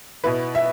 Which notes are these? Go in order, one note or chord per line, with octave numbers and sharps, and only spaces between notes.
B2 B3 E4 B4
E5